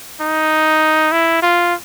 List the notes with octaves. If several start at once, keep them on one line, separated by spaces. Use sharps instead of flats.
D#4
E4
F4